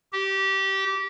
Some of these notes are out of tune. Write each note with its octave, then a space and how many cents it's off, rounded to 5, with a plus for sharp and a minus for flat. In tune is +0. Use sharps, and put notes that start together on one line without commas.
G4 -20